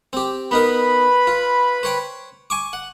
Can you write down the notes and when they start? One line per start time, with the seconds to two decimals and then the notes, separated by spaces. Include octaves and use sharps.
0.13 C4 G4
0.51 B3 D#4 A#4 B4 B5
1.27 F4
1.83 C5 C#5 G5
2.50 G#5 C#6 D6
2.73 F#5